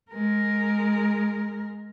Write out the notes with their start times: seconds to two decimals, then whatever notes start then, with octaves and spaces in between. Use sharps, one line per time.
0.12 G#3 A#4